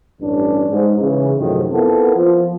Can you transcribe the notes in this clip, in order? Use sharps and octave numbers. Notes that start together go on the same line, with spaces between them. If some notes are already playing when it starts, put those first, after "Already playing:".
A1 G2 C#4 D4
G#2
C#3 E3
F#2 A2 C3 D#3 F3
B3 C4 E4 F4 A4 A#4
F3 F4